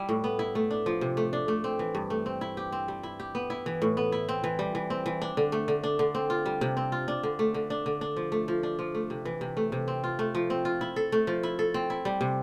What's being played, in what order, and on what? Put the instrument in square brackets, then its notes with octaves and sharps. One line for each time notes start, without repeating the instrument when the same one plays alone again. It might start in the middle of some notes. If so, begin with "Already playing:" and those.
Already playing: [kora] G3 E4
A2
B3
E4
A3
D4
F3
C3
A3
D4
A3
C4
E3
G2
A3
C4
E4
G4
C4
G3
E4
G4
B3
E4
E3
A2
B3
E4
C4
E3
G3
E3
C4
E3
D4
D3
A3
D3
D4
D3
C4
F4
G3
C3
C4
F4
D4
D3
A3
D3
D4
D3
D4
F3
A3
F3
D4
F3
A3
C3
E3
C3
A3
C3
C4
F4
A3
F3
C4
F4
E4
A4
A3
F3
E4
A4
C4
E4
G3
C3